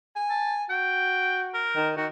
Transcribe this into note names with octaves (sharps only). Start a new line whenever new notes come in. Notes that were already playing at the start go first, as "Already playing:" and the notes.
G#5
A5
F#4 G5
A#4
D#3
D#3 F#4